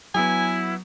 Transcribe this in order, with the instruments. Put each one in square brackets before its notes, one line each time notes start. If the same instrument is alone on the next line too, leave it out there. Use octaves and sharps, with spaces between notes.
[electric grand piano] F#3 B3 [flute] E4 [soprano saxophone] G#5